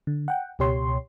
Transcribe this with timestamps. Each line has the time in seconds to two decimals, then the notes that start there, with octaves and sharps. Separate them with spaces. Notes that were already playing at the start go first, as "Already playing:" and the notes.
0.07 D3
0.28 F#5 G5
0.59 C#2 B2 G4 C#5 C6